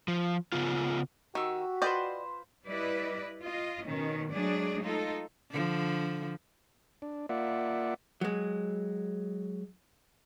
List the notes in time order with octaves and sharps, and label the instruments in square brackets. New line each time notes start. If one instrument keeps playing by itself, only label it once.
[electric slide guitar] F3
C#3 B3 F4
[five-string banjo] D#3 [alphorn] F#4 [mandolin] G4 C#6 E6
[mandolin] F4 B4 C5 [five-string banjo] D5 D#5 G5
[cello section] G3 E4 B4 D5 D#5
F4 D#5
B2 D#3 C#4
F#3 G#3 A3 D4 G#4 D5
D#4 F4 A4
[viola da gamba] D3 F3
[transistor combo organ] D4
A#3 F4 D5 E5 F#5
[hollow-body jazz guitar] F#3 G#3